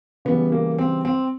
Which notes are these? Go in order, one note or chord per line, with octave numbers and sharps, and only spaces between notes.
C#3 E3 G3 B3
A#3
C4
C4